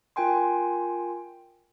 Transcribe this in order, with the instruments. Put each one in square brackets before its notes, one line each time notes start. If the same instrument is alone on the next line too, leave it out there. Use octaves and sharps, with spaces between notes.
[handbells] F4 A#4 G5 G#5 C6